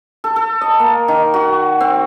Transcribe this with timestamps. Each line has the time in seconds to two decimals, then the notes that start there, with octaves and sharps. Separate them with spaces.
0.24 A4
0.36 A4
0.61 D#5
0.79 A#3
1.08 D#3
1.34 F#4
1.80 C4